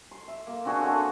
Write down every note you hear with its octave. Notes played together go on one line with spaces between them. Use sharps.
C6
E5
A#3
C4 D4 F#4 G#4
A4 C#5